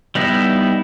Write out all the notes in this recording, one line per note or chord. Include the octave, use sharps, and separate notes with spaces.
G3 B3 D#4 E4